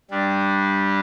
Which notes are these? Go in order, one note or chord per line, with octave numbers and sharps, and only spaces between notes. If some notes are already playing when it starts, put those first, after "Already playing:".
G2 G3 D4